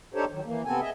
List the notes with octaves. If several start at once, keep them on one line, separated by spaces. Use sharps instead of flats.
D4 D#4 G4 A4 C5 C#5
D#3 F#3
E3 A#3
C3 B3 C4 A4 G#5
G#4 D#5 E5